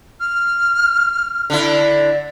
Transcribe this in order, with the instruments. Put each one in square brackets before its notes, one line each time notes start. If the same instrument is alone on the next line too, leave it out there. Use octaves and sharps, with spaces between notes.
[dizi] F6
[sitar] D3 E4